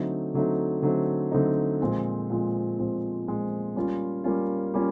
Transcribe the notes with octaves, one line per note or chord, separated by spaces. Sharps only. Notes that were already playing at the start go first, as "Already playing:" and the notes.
Already playing: D3 F#3 A3 C4 D#4
D3 F#3 A3 C4 D#4
D3 F#3 A3 C4 D#4
D3 F#3 A3 C4 D#4
A#2 F3 G#3 C4
A#2 F3 G#3 C4
A#2 F3 G#3 C4
A#2 F3 G#3 C4
G3 A#3 C#4 F4
G3 A#3 C#4 F4
G3 A#3 C#4 F4